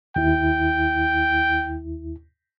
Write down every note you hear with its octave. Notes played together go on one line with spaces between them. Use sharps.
D#2 E4 G5